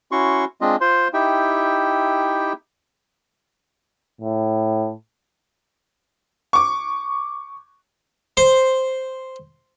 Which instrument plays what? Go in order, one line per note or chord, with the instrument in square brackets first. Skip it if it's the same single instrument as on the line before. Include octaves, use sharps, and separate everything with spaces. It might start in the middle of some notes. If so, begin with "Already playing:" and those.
[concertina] C#4 E4 F#4 C6 C#6
G#3 C4 D4 F4 D#5
F4 C5 C6
D#4 E4 G4 E5 G5
[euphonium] A2
[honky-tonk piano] C#6 D6
[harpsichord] C5